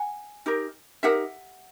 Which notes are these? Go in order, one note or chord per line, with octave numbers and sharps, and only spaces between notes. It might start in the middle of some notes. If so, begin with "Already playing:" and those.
Already playing: F#5 G#5
D#4 G4 A#4
D#4 G4 A#4 E5 F#5